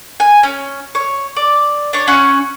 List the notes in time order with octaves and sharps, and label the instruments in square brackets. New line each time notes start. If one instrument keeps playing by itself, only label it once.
[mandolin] G#5
C#4
C#5
D5
D4 C#5
C#4 C#5 F#5 C#6